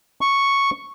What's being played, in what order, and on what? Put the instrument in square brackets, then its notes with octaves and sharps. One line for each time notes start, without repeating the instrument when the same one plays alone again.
[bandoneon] C#6